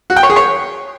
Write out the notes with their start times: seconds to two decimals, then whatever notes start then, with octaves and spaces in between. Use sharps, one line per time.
0.10 F#4
0.16 G5
0.23 C#5
0.30 G#4
0.36 C#5